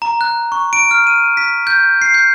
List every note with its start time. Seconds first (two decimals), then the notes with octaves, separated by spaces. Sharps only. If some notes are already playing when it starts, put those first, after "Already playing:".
0.02 A#5
0.21 F#6
0.52 C#6
0.73 D7
0.91 F6
1.07 D#7
1.37 B6
1.67 G6
2.02 C7
2.14 G6